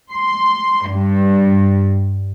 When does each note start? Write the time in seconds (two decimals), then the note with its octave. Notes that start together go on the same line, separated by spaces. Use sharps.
0.12 C6
0.91 G2